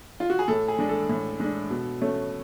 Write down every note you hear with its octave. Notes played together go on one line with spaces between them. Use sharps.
F4
F#4
G#4
A2 A4
G#4
G#3 D4
A4
A2
G#3 D4
B2
A3 C#4